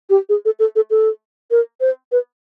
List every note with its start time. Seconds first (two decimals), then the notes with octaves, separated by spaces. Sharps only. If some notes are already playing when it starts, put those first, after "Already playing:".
0.10 G4
0.29 G#4
0.45 A4
0.59 A4
0.76 A4
0.90 A4
1.51 A#4
1.81 C5
2.12 B4